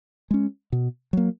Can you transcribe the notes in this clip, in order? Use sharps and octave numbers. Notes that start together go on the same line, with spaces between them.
G#3 C#4
B2
F#3 A#3